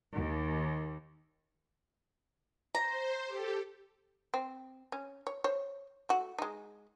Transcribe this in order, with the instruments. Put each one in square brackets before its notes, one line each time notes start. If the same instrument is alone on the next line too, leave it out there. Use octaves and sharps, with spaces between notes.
[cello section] D#2
[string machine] C5 [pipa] A#5
[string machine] G4 A4
[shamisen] C4
C#4
C#5
C5 C#5
A3 F#4
G#3 D#4